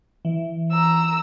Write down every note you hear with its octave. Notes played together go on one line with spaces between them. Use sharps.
E3
A#5 E6